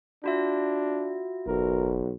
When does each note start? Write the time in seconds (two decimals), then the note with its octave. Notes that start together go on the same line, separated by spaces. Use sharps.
0.24 D4 F4 F#4 E5
1.47 F#1 B1 A#4